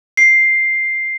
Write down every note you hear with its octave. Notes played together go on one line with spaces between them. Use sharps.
C7